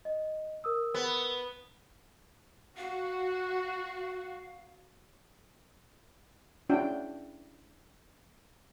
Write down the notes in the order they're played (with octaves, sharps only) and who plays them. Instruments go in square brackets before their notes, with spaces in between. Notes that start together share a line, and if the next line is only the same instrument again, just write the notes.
[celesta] D#5
A#4 D#6 E6
[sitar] B3
[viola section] F#4 [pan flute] F5
[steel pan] C#4 D4 E4 F#4 G5